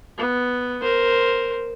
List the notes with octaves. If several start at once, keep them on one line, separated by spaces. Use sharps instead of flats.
B3
A#4 C5